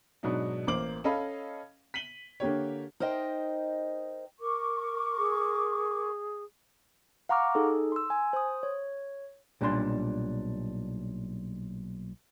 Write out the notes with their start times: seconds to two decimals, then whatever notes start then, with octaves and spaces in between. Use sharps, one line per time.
0.23 G#2 B2 F#3 B3 D4 D#4
0.67 A1 A#3 C5 D6 F#7
1.04 C#4 A4 D#5 F5 B5
1.94 B6 D#7 F#7 G7
2.40 D3 A#3 G4 C#5
3.00 D#4 A#4 C5 D#5 G5
4.40 A#4 C#6 D6
5.18 G#4
7.29 F5 F#5 A#5 C#6 D6 F6
7.55 D#4 G#4 A4
7.92 C6 E6
8.10 G#5
8.33 C5 D#6
8.63 C#5
9.61 B1 A#2 G3 D4 D5 C6